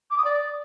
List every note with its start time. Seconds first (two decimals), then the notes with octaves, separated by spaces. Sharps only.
0.10 D6
0.17 D#6
0.24 D5